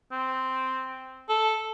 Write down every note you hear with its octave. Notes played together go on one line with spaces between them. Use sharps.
C4
A4